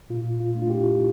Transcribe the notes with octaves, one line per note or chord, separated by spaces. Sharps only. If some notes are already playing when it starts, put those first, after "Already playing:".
A#2 F4
F4
A3 D4
F4
E4 G4